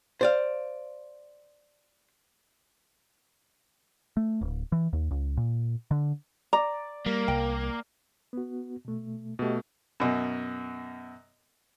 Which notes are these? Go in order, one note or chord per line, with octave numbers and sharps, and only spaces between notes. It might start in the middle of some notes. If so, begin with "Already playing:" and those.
C5 D5 F5
A3
D1
E3
D#2
C#2
A#2
D3
D5 A#5
G3 A#3
C2 G5
B3 F#4
B2 A3
B2 A3 G4 D#5
F#2 B2